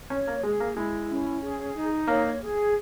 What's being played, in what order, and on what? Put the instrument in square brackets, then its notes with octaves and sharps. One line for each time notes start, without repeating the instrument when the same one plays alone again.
[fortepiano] C#4 [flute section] C#5
[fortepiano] A#3
[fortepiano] G#3 [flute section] G#4
[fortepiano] A#3
[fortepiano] G#3 [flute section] E4
[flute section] C#4
G#4
D#4
[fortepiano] A#3 [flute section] C#5
[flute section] G#4